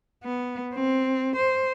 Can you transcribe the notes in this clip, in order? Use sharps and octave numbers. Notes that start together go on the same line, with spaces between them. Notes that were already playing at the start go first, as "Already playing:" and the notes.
B3
C4
C5